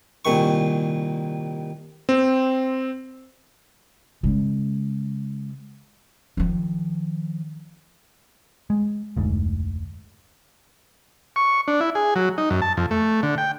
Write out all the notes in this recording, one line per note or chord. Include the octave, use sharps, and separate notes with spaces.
C2 A#2 D#3 C#6
C4
C#3 G#3
D#3 F3
G#3
F1 D2 G#2
C#6
D4
E4
G#4
F#3
D#4
F#2
A5
F2
A3
D3
G5